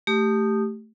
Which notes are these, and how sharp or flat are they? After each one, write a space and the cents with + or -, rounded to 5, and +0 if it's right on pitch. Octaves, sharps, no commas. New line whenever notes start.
A3 +0 G4 +0 D#6 -15